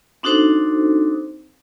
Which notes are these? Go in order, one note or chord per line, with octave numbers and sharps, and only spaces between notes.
C4 D4 D#4 F#4 A4 C5